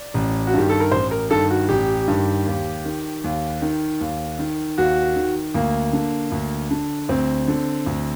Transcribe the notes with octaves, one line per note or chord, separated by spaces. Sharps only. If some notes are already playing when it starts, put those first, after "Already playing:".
Already playing: D5
A1
F#4
G2 D#3 G4
A4
A#4
A1 C5
A#4
G2 D#3 A4
F#4
A1 G4
G2 D#3
D#2
D#3
D#2
D#3
D#2
D#3
D#2 F#4
D#3
D2 A#3
D3
D2
D3
D2 C4
D3
D2